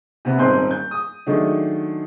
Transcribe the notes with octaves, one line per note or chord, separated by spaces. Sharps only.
C3 B3
D#1 G#2 C4 C6 G6
G6
D#6
D#3 F#3 G#3 A3 D4